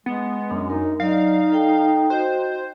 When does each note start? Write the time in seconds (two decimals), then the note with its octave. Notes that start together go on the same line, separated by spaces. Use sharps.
0.06 G#3 B3
0.51 F#2 D4
0.70 D#4 A#4
1.00 F#3 D#4 D5 D#5 F5
1.52 A4 G5
2.10 F#4 C5 D#5